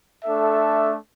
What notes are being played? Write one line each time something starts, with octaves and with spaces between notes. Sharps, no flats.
A3 D4 A4 E5